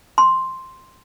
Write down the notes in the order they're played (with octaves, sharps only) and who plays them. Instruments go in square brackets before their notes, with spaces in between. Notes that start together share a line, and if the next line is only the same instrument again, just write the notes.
[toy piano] C6